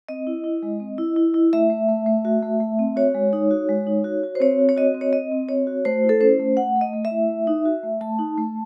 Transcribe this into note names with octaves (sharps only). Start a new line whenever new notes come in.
C4 D#5
E4
E4
G#3
C4
E4
E4
E4
A3 E5
A3
A3
A3
F#4
A3
A3
C4
F#4 C#5
G#3
D#4
F#4
G#3
D#4
F#4
F#4
C5
C4 C#5
F#4
C#5
F#4 D#5
C4
C#5
C4 D#5
C4
F#4 C#5
F#4
A3 C5
E4
A4
C#4 C5
A3
A3 F#5
A3
D#5
A3
E5
E4
A3
D#4
F#4
A3
A3 A5
D#4
A3